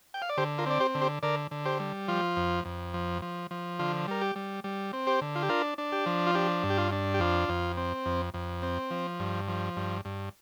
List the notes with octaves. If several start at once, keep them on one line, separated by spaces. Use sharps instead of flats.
G5
F5
D5
D3 G4 C5
F4 A#4
C4 D5
G4 C5
D3
G4 C5
D3 A#4 D5
D3
G4 C5
G3
F3 F4
F2
F2
F3
F3
F3
D3 F4
G3 A#4
G4
G3
G3
C4
G4 C5
D3
F4
G4
D4 F4 A#4
D4
G4
F3
F4
D4 G4
G2
G4
F4
D4
G4
F2 F4
F2
C4
F2
F2
C4
F3
G2
F3
G2
G2